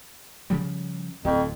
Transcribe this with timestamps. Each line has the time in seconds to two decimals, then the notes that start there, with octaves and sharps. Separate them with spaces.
0.50 C#3 F3 G3
1.25 D1 F2